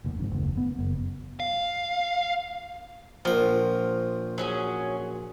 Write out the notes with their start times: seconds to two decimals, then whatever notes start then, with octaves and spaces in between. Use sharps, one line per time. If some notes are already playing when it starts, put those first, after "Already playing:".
0.04 F1 D#2
0.19 F1 F2 G#2
0.31 F#1 D#2
0.57 B3
0.79 F#1
1.40 F5
3.25 A#1 F3 A#4
4.38 F#3 C#4 G#4